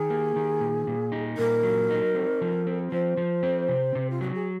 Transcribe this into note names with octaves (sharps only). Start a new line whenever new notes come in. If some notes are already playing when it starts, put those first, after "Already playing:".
Already playing: D#3 G#4
A#3
D#3
A#2
A#2
D#4
A#2 A#4
F#3
D#4
C4
F3
C4
F3 C5
F3
C4
C3
C3
F4
F#3 F#4
G#4